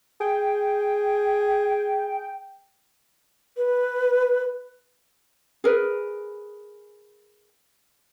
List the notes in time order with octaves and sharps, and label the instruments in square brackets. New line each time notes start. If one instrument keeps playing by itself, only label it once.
[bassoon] G#4 [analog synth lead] G5
[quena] B4
[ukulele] G#4 A#4 B4